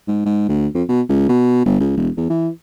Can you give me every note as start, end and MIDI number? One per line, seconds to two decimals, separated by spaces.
0.08 0.22 44
0.26 0.44 44
0.49 0.67 38
0.75 0.83 41
0.89 1.01 47
1.09 1.26 37
1.29 1.64 47
1.65 1.80 31
1.80 1.96 37
1.97 2.09 28
2.17 2.27 40
2.29 2.49 52